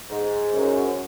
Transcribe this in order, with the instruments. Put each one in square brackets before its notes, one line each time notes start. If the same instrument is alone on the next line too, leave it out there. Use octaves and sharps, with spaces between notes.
[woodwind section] G#2
[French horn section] F#2